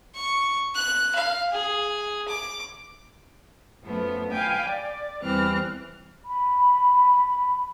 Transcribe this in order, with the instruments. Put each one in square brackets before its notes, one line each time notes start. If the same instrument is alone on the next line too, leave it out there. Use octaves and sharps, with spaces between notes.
[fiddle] C#6
F#6
F5
G#4
D6
[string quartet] F#2 F3 A3 B3
F5 G5 G#5 B5 G6
D5
E2 E3 G3 C4 F6 F#6
[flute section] B5